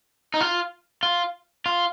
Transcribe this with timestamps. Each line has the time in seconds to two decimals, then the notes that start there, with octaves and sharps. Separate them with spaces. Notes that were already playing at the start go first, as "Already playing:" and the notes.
0.34 D#4
0.41 F4
1.03 F4
1.66 F4